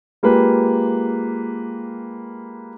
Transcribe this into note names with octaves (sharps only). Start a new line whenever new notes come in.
G#3 A#3 F4 G4 B4